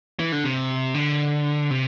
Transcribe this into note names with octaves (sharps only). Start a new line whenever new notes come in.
E3
D3
C3
D3
C3